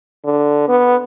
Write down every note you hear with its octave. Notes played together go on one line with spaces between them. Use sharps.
D3
B3